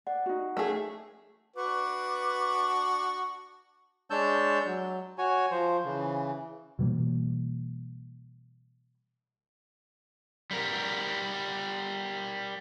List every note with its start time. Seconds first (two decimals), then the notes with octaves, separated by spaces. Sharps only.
0.07 D5 F#5
0.26 D#4 F#4
0.57 A3 G#4
1.56 D4 F#4 B4 D6
4.10 G#3 D4 C#5 A5 E6 G6
4.66 F#3
5.18 F#4 C#5 G#5
5.51 F3 C5
5.85 C#3 E3
6.79 B2 E3 G3 A#3
10.51 G3 A#4